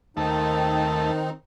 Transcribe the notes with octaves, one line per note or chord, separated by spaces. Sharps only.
D#2 D#3 A3 C4 D#4